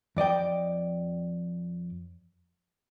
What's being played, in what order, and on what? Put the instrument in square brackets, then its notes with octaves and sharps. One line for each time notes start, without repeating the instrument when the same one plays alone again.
[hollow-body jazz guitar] F2 D5 D#5 G5